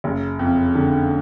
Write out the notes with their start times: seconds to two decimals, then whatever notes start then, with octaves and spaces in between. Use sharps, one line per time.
0.04 F#1
0.39 F2
0.75 D3